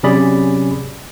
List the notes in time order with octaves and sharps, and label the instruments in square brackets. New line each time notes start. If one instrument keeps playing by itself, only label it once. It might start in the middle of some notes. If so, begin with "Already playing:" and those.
[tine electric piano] C3 F#3 C#4 G#4 D5 B5